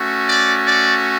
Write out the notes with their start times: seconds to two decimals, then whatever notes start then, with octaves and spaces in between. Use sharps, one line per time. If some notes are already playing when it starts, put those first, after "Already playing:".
Already playing: A3 C#4 F#4
0.26 D5
0.65 D5